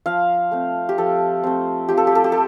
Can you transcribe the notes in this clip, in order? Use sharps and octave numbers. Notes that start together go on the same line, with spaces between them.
F3 F5
A3 C4
G4
F3 A4
A3 C4
F3 G4
A4
G4
A4
G4
A4